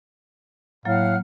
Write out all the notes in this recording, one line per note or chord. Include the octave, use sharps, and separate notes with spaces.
A2 F#3 A#3 F5 F#5 F6